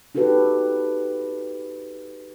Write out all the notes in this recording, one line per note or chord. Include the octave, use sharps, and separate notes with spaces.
D#4 F#4 G4 A4 B4